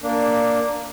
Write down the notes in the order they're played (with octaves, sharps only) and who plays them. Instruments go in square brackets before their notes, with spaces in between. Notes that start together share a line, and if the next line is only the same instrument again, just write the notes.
[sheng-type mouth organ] A#3 D4